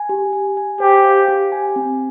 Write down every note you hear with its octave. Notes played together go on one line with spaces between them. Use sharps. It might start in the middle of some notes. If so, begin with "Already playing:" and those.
Already playing: G#5
G4
G#5
G#5
G4 C5
F5
G4
G#5
C4